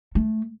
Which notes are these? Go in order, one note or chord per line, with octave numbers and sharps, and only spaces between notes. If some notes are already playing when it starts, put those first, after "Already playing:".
A3